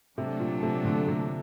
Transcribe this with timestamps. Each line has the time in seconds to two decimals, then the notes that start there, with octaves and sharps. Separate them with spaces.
0.17 C3 F#3 A3 D4 A4
0.40 A#2
0.63 C3
0.85 A#2 D3
1.08 C3